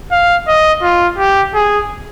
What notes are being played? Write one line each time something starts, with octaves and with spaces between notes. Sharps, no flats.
F5
D#5
F4
G4
G#4